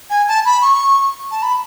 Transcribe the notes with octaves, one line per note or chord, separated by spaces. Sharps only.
G#5
A5
B5
C#6
A5
B5